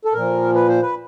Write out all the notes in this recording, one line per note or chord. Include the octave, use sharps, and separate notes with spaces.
A4
A#2 F3 A#4
B4
C5
B4